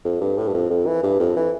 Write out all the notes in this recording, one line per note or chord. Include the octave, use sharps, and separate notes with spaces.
F2
G2
A2
G2
F2
F2
E3
G2
F2
E3